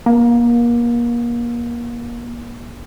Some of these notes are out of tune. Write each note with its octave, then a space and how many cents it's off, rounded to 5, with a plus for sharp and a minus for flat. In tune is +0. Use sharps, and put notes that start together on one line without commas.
A#3 +30